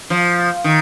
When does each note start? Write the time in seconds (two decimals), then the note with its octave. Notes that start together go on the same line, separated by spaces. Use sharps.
0.10 F3
0.64 D#3